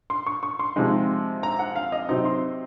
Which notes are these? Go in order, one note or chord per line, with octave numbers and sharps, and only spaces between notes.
C6
C#6
C#6
C6
C3 F3 G#3 D#4
A#5
F#5
F5
D#5
C3 F#3 C4 D#4 D#5
C6